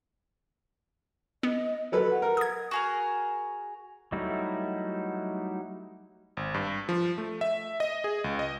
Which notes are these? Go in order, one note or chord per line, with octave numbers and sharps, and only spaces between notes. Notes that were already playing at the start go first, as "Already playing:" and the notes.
B3 D#5
F#3 A4 B4 D#5
F#5
A#4
D#6 G#6
F#4 G#4 A#4
F#3 G3 A3 D#4 E4
G#1
G2
F3
A3
E5
D#5
G#4
C#2
D#5